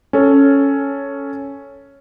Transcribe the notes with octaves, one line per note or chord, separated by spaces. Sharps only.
C#4 A4 C#5